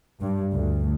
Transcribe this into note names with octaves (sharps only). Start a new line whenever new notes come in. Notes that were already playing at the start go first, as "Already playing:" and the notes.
G2
D2